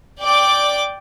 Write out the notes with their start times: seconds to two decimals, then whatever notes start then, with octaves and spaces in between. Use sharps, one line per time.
0.21 D5 G5 D6